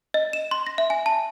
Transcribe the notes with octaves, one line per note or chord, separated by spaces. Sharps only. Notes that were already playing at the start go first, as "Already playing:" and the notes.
D#5
E7
C6
A#6
E5
G#5
A5